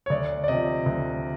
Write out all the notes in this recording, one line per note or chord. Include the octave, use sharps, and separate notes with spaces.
C#5
D2 D5
D5
C3 F3 D#5
D2